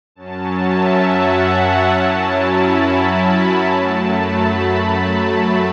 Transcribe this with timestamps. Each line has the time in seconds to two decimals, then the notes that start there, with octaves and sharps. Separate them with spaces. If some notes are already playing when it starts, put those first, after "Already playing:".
0.15 F#2 F#3 C#4 A5
0.59 E5
1.03 F#5
1.91 F#2 F#3 C#4 E4 A5
2.36 B5
2.81 B5
3.68 F#2 F#3 A3 A5
4.13 B5
4.56 A5